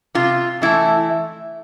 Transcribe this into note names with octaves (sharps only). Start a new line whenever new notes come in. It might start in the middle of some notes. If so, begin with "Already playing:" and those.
C3 F4
E3 A3 E4